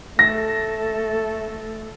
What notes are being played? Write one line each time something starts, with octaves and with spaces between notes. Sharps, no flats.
A3 A4 A#6